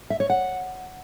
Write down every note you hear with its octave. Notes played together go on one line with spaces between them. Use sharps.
E5
C#5
F#5